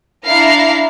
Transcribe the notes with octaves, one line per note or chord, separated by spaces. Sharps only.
D4 E4 F5 A#5 C7